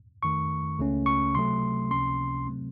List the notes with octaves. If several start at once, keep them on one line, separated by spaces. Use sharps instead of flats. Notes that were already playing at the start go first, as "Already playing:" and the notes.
F2 D#3 A3 C#6
C#2 C#3 A3 C#4
C#6
C3 F#3 A3 C6
C#2 C3 F3 A#3 C#4 C6
C3 F#3 A3 C4